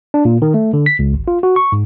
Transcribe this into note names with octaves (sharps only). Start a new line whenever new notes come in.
D4
A#2
D#3
A3
D3
B6
C#2
G#1
F4
F#4
C#6
G#2